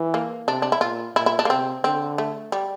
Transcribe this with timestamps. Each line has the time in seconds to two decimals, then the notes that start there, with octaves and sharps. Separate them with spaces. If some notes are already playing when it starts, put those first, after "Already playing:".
Already playing: E3
0.14 A#3
0.48 C3 D4
0.62 D4
0.72 E4
0.81 A#2 F4
1.16 A#2 E4
1.26 E4
1.39 D4
1.45 A#3
1.50 C3 C4
1.84 D3 C4
2.18 A3
2.52 G3